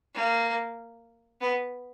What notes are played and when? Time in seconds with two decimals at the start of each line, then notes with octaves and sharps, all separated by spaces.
0.14 A#3
1.41 B3